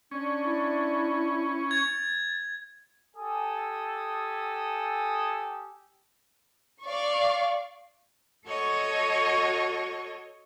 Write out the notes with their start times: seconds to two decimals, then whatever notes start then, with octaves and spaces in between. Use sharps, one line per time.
0.11 C#4 D4
0.44 E4
1.71 G#6 A6
3.15 G4 A4 G#5 D#6
6.84 D5 F5 C#6
8.47 F#4 A4 C#5 D#5 C#6